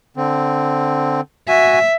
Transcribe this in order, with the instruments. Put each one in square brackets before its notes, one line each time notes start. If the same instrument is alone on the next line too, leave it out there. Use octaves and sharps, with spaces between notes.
[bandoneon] D3 C4
[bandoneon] F#4 G#5 [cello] E5